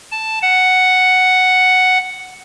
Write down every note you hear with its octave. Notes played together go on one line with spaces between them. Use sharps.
A5
F#5